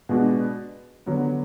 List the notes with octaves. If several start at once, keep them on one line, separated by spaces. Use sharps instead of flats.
B2 G#3 B3 D4 F#4
D3 F#3 B3